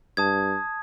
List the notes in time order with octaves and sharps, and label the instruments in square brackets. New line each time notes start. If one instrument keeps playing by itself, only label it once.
[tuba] G2 [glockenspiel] A5 D#6 G#6